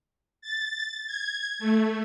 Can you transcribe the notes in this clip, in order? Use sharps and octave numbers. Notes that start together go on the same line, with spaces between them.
A6
G#6
A3